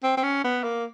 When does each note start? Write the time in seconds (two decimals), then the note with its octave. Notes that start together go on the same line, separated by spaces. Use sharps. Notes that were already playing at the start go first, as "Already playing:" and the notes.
0.03 C4
0.17 C4
0.23 C#4
0.44 B3
0.64 A#3